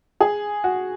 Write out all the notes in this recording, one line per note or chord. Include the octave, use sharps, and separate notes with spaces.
G#4
F#4